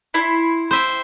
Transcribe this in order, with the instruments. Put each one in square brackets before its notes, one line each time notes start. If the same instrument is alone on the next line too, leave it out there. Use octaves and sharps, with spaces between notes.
[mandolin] E4 C6
[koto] C5 E5 G5